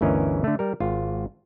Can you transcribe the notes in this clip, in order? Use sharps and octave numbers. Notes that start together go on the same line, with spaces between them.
G1 D2 E3 C#4 A#4 D#5
D3 A3
G3 A#4
G#1 F4